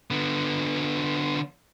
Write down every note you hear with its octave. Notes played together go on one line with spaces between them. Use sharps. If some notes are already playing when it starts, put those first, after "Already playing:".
D3 B3